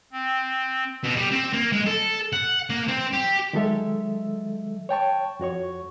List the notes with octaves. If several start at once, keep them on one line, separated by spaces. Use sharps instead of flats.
C4
B2
G3
C4
A#3
G#3
A4
F#5
A#3
C4
G4
D#3 F#3 G#3 A4 E5
C#5 G5 A5 C#6
F2 F#4 C#5 C#6